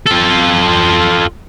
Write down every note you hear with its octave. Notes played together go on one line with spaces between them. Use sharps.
F4 A4